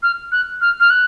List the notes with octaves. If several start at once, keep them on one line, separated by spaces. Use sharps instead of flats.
F6
F#6
F6
F6
F#6